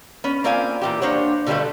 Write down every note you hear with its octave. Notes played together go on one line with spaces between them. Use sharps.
B3 C#4
A#3 C4 F4 D5 F5 G#5
A#2 E3 G4
A#3 D4 C5 C#5 F#5
B2 D3 G3 A3 F4 A4